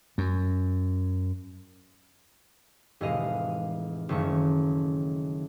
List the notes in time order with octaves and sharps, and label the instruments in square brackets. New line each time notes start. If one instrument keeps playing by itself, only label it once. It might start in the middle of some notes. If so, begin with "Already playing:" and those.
[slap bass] F#2
[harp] F1 A2 E3 G#3 D#5 F5
F#1 D#3 A3 C#6